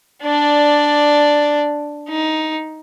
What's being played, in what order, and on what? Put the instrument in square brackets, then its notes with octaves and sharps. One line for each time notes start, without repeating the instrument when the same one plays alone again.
[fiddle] D4 D5
D#4